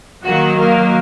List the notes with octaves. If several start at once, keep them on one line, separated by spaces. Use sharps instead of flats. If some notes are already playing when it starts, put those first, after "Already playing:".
D#3 F#3 A#3 F#4
A#3 A#4